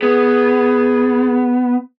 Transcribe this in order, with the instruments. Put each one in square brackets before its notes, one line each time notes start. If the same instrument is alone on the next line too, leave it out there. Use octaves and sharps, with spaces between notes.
[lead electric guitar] B3 [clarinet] G#4